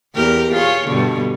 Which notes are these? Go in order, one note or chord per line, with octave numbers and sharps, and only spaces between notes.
E2 G4 A#4
F4 G#4 C#5
G2 B2 D3